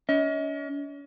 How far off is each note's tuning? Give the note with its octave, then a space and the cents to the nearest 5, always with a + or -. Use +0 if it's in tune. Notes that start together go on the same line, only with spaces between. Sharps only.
C#4 +40 D#5 +40